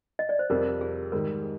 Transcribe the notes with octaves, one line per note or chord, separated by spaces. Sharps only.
D#5
D5
C5
F2 C3 G3 A#4
G#4
G#2 D#3 G3 A#4